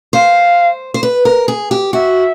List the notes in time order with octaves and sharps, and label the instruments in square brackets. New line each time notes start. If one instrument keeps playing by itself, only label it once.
[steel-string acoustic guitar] C5 [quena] F5
[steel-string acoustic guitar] C5
B4
A#4
G#4
G4
[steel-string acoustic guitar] F#4 [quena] E5